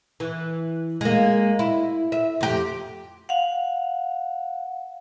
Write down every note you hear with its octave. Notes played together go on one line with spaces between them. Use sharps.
E3
G#3 A#3
E4
E5
F2 G4
F5 F#5